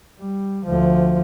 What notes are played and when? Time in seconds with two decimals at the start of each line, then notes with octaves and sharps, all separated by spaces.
0.19 G3
0.67 D2 F3